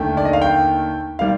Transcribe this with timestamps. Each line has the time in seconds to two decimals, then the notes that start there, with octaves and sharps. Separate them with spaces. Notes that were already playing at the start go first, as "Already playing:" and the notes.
Already playing: D#2 D3 A3 G5
0.17 D5
0.25 D#5
0.33 F5
0.42 G5
1.19 D#3 G3 F5